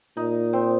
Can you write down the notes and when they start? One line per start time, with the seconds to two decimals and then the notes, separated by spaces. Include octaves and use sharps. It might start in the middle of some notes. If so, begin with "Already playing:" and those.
0.17 A#2 D#4
0.53 C4